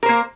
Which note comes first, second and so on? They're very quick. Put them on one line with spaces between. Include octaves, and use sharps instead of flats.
A#4 C5 A#3